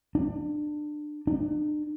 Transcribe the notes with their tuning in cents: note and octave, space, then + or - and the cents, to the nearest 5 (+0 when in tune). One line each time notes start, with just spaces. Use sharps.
D4 +25
D4 +40